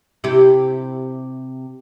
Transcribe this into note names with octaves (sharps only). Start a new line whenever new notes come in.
C3 E4 G4